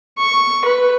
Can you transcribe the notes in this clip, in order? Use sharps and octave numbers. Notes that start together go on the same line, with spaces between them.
C#6
B4